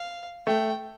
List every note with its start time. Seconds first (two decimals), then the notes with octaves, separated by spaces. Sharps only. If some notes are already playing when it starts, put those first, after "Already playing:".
Already playing: F5
0.47 A3 G5